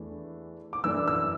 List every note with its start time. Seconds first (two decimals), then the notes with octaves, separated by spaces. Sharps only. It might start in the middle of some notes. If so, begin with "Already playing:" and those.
Already playing: E2 E3 A3 D4
0.73 D6
0.84 F#2 E3 A3 D4 E6
1.08 E6